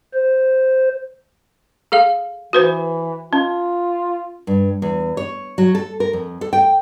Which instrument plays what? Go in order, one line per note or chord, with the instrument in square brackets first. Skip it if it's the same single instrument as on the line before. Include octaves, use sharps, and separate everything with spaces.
[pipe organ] C5
[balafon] G#4 A4 F5
[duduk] E3 [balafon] F#4 B4 C5
[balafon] C#4 [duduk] F4
[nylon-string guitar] G2
E2
C#5
F#3
A4
A#4
F2
A4
G5